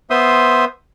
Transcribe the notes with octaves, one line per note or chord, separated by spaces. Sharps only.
B3 C5 E5 C6 D#6